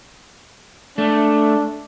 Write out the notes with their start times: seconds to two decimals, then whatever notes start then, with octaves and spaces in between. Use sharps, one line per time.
0.98 A3 D4